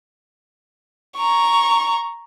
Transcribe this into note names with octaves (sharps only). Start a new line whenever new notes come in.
A#5 C#6